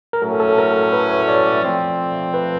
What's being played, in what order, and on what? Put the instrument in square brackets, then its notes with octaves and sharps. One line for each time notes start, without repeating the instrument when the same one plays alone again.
[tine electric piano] A#4
[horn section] A2 F#3 A3 C#4 [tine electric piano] A4
[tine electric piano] A4
A#4
B4
C#5
D5
D5
[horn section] F3 A3 C4
[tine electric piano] B4